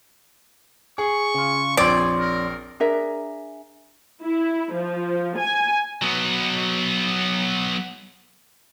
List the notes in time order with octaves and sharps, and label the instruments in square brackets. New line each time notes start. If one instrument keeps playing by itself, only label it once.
[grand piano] G#4 [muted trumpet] C#6
[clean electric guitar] C#3 F4
[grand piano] A#1 C4 [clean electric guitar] F2 C#5 C6 [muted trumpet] G#4 [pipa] D5
[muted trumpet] A#4
[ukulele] D4 G#4 A#4 E5
[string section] E4
F3
G#5
[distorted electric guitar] F#3 B3